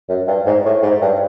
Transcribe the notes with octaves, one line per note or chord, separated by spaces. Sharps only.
F#2
G2
G#2
A2
G#2
G2